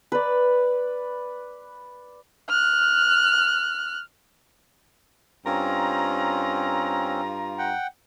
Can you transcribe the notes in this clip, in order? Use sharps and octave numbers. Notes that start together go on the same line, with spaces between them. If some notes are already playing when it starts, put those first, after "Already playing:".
B4 D5
F6 F#6
G2 C4 C#4 F4 A#5
F#5 G5